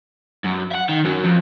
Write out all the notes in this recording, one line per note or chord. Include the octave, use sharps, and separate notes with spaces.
F#2
E5 F#5
D#3
F#2 F#3
F2